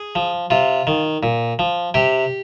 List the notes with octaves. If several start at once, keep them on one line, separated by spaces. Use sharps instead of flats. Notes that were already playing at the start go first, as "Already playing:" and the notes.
Already playing: G#4
F3
C3 F4
D#3
A#2
F3
C3 G4